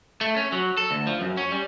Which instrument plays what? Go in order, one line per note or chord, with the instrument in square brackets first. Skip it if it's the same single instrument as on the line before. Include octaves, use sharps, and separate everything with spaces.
[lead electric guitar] A3
C#4
F#3
A4
D2
F3
F#2
C#4
G3